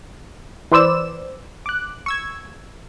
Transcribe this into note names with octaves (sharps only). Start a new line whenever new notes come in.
E3 B4 C5 D5 E6 E7
D6 F#6
C#6 E6 G#6